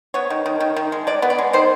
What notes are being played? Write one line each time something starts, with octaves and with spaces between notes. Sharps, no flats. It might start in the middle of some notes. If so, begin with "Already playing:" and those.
B3 C#5
D#3
D#3
D#3
D#3
G#3
G#3 D5
B3
D5
G#3
D#3 C5